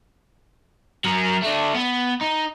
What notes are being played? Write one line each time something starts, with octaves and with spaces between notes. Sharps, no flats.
F#3 A#4
A3 D4
B3
D#4